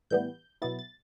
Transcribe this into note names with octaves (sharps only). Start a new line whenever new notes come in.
A2 E3 G3 B3 G6
B2 F#3 B3 E4 A6
A6